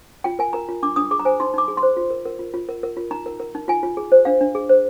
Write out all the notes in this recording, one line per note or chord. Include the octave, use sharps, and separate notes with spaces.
F4 G5
A#4 G#5
A#4 A#5
F4
D4 D6
D4 D#6
G#4 D6
A#5
C5 G#5
D#4 C6
D#4 D6
G#4
C6
C5
F4
A#4
A#4
F4
F4
A#4
A#4
F4
D#4 A#5
A#4
A#4
D#4
F4 G#5
F4
G#4
C5
D4 F5
D4
G#4
C5